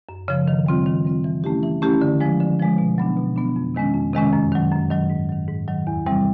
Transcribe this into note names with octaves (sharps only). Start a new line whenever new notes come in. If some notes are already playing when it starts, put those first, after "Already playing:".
F#2
C#3 F3
D#3
G3 C4 F4
D#3
G3 C4 F4
E3
A3 C#4 E4 G4
E3
A3 C#4 E4 G4
D3
F3 G#3
D3
F3 G#3
B2
F#3 B3 D4
B2
F#3 B3 D4
F2
C3 D#3 G#3 C#4
F2
C3 D#3 G#3 C#4
F#2
D#3 F#3
F#2
D#3 F#3
G#2
D#3 F#3
G#2
D#3 F#3
E2
C3 E3 G3 C4